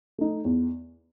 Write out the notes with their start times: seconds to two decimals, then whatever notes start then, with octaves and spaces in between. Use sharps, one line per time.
0.18 A3 D#4
0.45 E2